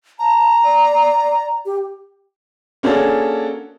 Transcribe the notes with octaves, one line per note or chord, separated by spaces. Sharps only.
A5 A#5
D5
G4
A#3 C#4 D4 F#4 G#4 A4